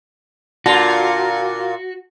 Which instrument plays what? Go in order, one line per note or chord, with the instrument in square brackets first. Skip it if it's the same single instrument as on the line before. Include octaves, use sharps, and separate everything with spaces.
[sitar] A#2 F4 [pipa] D3 [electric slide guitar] F#4